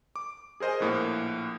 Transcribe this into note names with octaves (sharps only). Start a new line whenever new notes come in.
D6
G#4 A#4 C5 D#5 G#5
A#1 A2 A#3